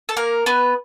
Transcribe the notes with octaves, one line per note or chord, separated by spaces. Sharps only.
A4
A#3 A#4
B3 B4